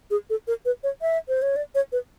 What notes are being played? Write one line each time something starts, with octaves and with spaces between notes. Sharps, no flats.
G#4
A4
A#4
B4
C#5
E5
C5
C#5
D5
C#5
B4